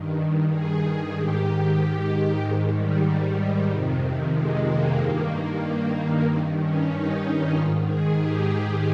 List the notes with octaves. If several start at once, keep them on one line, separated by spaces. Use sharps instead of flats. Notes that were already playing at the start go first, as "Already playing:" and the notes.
Already playing: G2 D#3
G#4
G#2 D#3 G4
G#2 D#3 G#3
G3
G3
F2 C3 D#3
G#3
A#3
G2 D#3
G2 D#3 C4
C#4
D#4
G#2 D#3 F4
G#4
G4